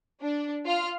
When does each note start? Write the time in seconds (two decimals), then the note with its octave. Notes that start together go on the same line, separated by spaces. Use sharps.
0.20 D4
0.66 F4 F6